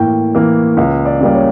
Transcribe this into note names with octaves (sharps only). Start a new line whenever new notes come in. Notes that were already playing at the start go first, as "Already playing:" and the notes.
Already playing: A2 E3 A#3 G5
E3 A#3
C#2 F5
D5
C#3 G3 A#3 D5
C#5